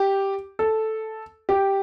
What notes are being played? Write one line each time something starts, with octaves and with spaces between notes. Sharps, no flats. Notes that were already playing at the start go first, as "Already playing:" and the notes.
Already playing: G4
A4
G4